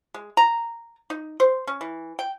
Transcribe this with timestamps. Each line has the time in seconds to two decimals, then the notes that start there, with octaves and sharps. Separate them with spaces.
0.14 G#3
0.37 A#5
1.10 D#4
1.40 C5
1.67 C#4
1.81 E3
2.19 G5